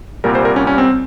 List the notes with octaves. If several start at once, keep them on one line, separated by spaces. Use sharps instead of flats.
C2 A#2 G3 A#4
C5
A#4
C#4
C#4
C4